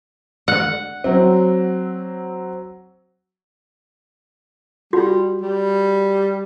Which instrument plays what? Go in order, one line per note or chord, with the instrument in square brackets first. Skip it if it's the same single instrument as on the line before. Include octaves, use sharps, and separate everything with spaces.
[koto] F#5
[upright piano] F#3 C4
[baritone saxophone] G3 [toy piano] F#4
[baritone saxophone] G3